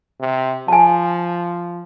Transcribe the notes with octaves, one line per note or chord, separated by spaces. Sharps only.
C3
F3 G#5 A5